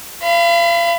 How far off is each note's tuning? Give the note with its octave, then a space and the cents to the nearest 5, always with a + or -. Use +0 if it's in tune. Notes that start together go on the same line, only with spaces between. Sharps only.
F5 -35 B5 +25